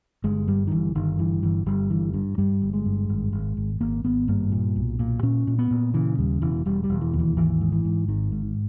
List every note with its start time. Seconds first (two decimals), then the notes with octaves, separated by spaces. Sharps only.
0.24 G1 G#3
0.47 G2 G3
0.67 D#3
0.71 G1 E3
0.95 G1 D#3
1.19 G2 E3
1.42 G1 E3
1.66 G1 G3
1.90 G2 E3
2.14 G2
2.38 G2 G3
2.62 G1
2.73 G#3
2.85 G2
3.09 G#1
3.32 G#1
3.57 G#1
3.81 G#1 A#3
4.04 G#1 B3
4.28 G2 A#3
4.52 A#2
4.76 B1
4.99 A#2
5.23 A#2 C#4
5.47 A#2
5.58 B3
5.71 A#2
5.94 C#3 E3
6.18 D#2 G3
6.42 E1 E3
6.66 E1 G3
6.84 G3
6.90 E1
7.01 E3
7.13 D#2
7.19 E3
7.37 G#1 E3
7.61 G#2
7.72 E3
7.85 G#2
8.08 G#1 D#3
8.32 G#2